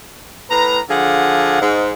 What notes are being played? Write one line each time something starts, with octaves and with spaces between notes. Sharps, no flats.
A2 B4 A#5
D3 F3 G#4 F5 F#5
G#2